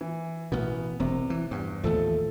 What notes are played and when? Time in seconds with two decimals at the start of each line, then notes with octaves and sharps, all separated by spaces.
0.01 E3
0.52 A1 B2 B3
1.00 E1 C3
1.30 E3
1.51 E2 G2
1.83 A1 D#2 F3 A3 A4